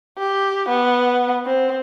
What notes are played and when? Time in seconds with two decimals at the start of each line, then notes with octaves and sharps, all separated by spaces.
0.18 G4
0.69 B3
1.46 C4